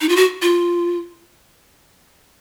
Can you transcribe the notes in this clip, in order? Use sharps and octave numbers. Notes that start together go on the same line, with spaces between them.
D#4
F4
F#4
F4